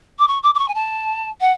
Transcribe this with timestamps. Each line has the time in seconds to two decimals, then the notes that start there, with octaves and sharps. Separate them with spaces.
0.19 D6
0.28 C#6
0.43 D6
0.55 D6
0.59 C#6
0.68 G#5
0.75 A5
1.41 F#5